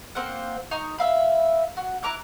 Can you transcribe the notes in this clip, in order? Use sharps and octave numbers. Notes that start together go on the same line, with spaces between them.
A#3 C4 C5 F#5
D#4 A#5 C#6
E5 F5 B5
F#4
E4 A#5 D6 F#6